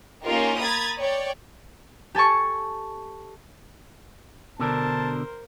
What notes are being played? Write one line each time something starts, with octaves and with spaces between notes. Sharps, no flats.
A#3 C#4 D#4 F4 G4 A#4
A#5 B5 D#6 G#6 A6
C#5 D5 G5
G4 A4 G#5 A5 C#6
B2 D3 D4 A#4 C5 A5